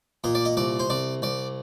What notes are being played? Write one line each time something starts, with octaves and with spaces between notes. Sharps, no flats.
A#2 D#5
D5
D#5
C2 D5
C5
C2 D5
C2 D5